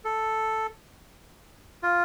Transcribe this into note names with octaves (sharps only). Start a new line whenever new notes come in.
A4
F4